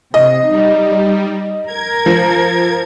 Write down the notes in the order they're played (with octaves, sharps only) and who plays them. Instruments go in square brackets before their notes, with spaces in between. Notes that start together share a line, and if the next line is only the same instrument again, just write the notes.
[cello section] C3 [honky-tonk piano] D#5
[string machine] G3 [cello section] D#4
[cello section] A#4 [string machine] G#6
[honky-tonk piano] F3